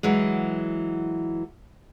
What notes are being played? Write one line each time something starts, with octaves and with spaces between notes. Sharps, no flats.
E3 F#3 G#3